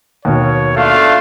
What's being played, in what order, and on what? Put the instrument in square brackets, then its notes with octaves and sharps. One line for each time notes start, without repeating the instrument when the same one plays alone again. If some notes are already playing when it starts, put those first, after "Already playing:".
[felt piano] D#2 B2 [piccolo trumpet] C#5
[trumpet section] A3 D4 F4 [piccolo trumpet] F5